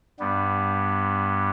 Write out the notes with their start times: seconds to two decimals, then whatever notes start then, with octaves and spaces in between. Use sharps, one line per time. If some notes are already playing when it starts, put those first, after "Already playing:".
0.20 G2 G3 B3